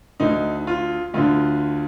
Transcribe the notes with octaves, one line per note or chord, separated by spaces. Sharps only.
D2 D3 D#4
F4
D2 D3 F4